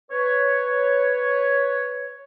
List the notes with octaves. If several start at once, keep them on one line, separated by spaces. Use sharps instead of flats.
B4 C#5